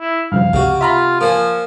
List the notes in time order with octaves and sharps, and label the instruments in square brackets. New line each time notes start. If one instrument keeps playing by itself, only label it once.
[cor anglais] E4
[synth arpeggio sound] G2 C#3 F3 [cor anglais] F5
[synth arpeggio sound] C#2 [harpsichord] C3 F#4
[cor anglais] F4 [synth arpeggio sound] E5 A#5 B5
[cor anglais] F3 [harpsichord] A#3 C5 G#5